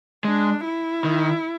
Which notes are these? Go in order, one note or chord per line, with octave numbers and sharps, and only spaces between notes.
G#3 D4
E4
D#3